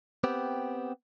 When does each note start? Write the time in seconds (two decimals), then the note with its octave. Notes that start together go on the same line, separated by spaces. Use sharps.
0.24 B3 C4 G4